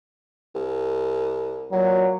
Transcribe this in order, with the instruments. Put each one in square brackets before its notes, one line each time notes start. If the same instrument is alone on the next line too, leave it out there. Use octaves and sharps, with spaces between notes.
[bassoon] C2
[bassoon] A#2 [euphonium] F#3